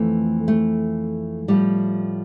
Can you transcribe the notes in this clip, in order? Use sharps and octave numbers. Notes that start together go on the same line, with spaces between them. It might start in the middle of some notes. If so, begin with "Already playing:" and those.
Already playing: F2 E3 A3
A3
A2 F3 G3